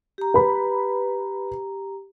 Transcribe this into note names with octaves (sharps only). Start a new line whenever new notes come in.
G4 A#5
B4 B5